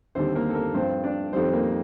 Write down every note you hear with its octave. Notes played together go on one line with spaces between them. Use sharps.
D#2 D3 G3 C4 C5
A#3 A#4
A4
A#3 A#4
G2 F3 C4 C5
D4 D5
F2 D#3 G3 C4 C5
A#3 A#4